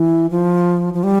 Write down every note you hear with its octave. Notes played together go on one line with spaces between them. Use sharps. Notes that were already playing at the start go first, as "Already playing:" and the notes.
Already playing: E3
F3
F3
G3